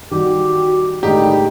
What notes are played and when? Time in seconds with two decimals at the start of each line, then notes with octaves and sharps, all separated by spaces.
0.11 D#3 G3 F#4 G4
1.03 A2 D3 D#3 G3 G#3 D#4 G4